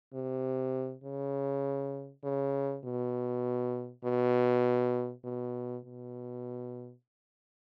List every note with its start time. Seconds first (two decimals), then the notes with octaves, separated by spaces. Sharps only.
0.14 C3
1.04 C#3
2.24 C#3
2.85 B2
4.05 B2
5.25 B2
5.85 B2